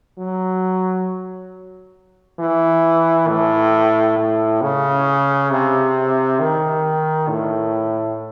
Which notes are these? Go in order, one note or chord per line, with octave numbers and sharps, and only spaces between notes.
F#3
E3
A2
A2
C#3
C3
D#3
A2